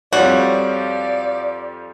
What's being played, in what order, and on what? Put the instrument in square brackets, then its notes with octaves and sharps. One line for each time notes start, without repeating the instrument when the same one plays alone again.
[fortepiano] F2 F3 G3 [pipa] F#4 [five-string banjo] C#5 [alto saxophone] D5